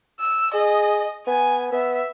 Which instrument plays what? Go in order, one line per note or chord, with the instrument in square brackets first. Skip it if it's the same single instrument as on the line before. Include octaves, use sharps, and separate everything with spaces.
[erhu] E6
[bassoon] G#4 [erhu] D#5
[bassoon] B3 [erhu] G#5
[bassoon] B3 [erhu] E5